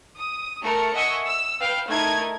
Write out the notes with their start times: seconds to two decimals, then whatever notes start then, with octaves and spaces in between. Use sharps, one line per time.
0.16 D#6
0.62 A3 A#4 C#7
0.94 D#5 E5 F#5 G#5 C#6 E6
1.25 E6
1.60 B4 F5 G5
1.88 A3 D#4 E4 A#4 G#6